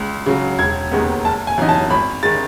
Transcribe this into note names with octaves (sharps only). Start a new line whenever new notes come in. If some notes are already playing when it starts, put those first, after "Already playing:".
Already playing: C#2
C#3 F#3
E1 G#6
D#2 D#3 G#3 B3
F#1 A5
G#5
F#2 E3 B3 D#4
A5
G#1 B5
D#3 G#3 A6